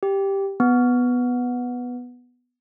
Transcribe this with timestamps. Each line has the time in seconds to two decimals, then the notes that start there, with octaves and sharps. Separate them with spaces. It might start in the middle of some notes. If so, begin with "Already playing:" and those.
0.03 G4
0.60 B3